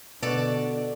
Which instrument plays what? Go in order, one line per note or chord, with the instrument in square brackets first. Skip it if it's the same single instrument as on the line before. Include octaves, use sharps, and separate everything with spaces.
[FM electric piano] B2 F#4 [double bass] D3 D4 [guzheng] A4 D5